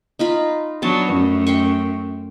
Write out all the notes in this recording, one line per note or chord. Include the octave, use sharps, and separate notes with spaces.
D#4 F4 B5
F#3 B3 D4 A5
F#2 A3
G5 C6 C#6